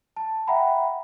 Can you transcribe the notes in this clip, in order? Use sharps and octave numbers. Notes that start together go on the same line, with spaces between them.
A5
E5 F#5 G5 A#5 B5